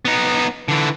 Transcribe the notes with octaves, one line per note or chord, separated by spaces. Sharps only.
B3 D#4
D3 E3